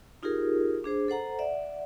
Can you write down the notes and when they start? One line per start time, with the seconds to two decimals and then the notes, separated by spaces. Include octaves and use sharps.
0.23 D#4 F4 G4 G#4 A#4
0.84 D4 G#4 C5
1.08 A4 C5 F#5 A#5
1.39 D5 E5 F#5